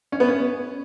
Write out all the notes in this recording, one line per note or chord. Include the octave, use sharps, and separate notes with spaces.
C#4
B3
C#4